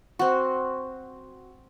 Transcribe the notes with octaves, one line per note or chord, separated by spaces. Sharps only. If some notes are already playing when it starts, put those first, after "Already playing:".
C4 F#4